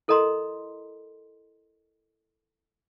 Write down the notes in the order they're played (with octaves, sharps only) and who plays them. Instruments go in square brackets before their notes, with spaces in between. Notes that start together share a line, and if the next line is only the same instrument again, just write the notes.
[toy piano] E4 A4 A#4 D#5 A#5 C6